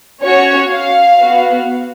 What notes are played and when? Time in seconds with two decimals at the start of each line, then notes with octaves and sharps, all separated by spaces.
0.21 C#4 F#4 C#5
0.70 F5
1.19 B3 F#4